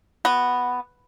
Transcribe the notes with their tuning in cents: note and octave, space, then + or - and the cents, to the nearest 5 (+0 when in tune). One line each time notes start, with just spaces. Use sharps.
B3 +0 F#4 +0